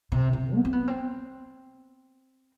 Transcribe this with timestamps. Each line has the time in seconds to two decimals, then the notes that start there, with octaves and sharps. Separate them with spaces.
0.12 C3
0.33 C3
0.55 B3
0.65 C4
0.73 B3
0.88 C4